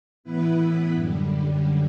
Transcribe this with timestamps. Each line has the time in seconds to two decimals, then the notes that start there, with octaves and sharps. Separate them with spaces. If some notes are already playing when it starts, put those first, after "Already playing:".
0.24 A2 E3 B3 E4 B4
0.93 F#2 D3 G3